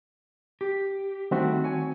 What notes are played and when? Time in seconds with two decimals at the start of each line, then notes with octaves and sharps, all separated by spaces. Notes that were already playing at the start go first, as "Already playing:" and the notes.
0.61 G4
1.31 D#3 G3 A3 C4 D4 F#4
1.64 C#5 G#5